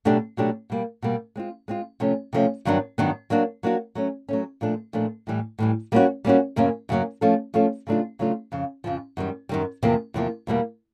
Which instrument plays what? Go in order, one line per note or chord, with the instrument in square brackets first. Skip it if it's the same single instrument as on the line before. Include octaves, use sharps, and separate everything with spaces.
[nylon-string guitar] B2 F#3 A3 D4 G4
B2 F#3 A3 D4 G4
B2 G3 A#3
B2 G3 A#3
G#3 C4 F4
G#3 C4 F4
C3 F3 A3 C#4
C3 F3 A3 C#4
G2 D#3 F#3 B3 D4
G2 D#3 F#3 B3 D4
F#3 A#3 D4 F#4
F#3 A#3 D4 F#4
F#3 A3 C#4
F#3 A3 C#4
A#2 F3 A3 D4
A#2 F3 A3 D4
A2 E3 G3
A2 E3 G3
G3 A#3 C#4 F#4
G3 A#3 C#4 F#4
F#2 C#3 F#3 A#3 C#4
F#2 C#3 F#3 A#3 C#4
F3 A3 C#4 F4 A4
F3 A3 C#4 F4 A4
C#3 F#3 A3 D4 F4
C#3 F#3 A3 D4 F4
F2 C#3 F3
F2 C#3 F3
F#2 D#3 G3
F#2 D#3 G3
E2 C3 F3 A#3
E2 C3 F3 A#3
E2 B2 G3 A#3